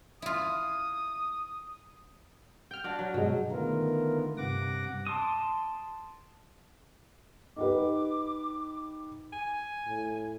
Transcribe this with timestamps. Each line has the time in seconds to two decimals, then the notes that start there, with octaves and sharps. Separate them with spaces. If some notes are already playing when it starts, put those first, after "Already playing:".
0.22 E4 F4 D#6
2.71 G5 F6 G6
2.84 D4 F#4 D5
2.99 F#3
3.14 G2 B2 F#3 G#3
3.51 D3 D#3 A3 B3 F4 A#4
4.37 G2 C3 F#5 D6 A#6
5.07 A5 C6 D6 D#6
7.56 D#4 G4 B4 D6
9.33 G#5
9.88 A2